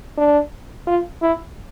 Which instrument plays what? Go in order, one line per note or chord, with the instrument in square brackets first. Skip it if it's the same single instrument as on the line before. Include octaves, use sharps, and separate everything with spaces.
[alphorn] D4
F4
E4